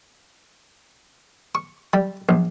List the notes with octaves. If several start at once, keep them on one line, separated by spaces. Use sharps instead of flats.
C#6
G3
A#1